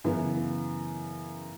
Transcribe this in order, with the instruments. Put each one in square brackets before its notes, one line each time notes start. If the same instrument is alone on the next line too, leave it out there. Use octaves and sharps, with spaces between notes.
[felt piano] F#2 C#3 E3 B3